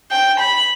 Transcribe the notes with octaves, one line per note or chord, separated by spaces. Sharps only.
G5
B5